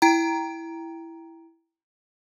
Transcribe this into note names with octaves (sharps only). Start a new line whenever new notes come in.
E4 G5 A#5